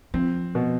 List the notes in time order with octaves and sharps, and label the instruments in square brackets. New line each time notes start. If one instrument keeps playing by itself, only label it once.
[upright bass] F3 [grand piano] C4
[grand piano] B2